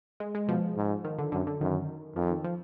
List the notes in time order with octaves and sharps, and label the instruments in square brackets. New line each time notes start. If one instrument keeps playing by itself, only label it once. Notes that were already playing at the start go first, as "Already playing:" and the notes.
[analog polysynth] G#3
G#3
[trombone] B2 [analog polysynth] F3
[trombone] G#2
[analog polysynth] D#3
D3
[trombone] F#2 [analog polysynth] D3
[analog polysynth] D3
[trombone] F#2 [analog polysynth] D#3
[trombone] F2 [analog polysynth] F3
[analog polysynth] D#3
F3